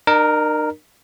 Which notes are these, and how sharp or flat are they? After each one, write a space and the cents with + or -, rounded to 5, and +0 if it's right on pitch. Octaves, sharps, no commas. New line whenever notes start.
D#4 -45 A#4 +0